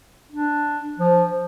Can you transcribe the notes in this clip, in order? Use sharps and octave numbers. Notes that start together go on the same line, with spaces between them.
D4
F3